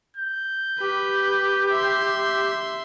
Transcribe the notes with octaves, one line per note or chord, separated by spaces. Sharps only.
G6
G4 B4
E5 C6